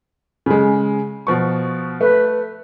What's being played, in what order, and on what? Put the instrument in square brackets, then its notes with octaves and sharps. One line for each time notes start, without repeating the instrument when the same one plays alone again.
[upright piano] C#3 G#3
B2 F3 C#6
[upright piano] A3 [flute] B4